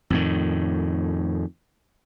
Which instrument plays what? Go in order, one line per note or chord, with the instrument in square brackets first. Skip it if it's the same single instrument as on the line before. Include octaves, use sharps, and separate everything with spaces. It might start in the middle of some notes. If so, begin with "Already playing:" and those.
[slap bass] F2 A2 D#3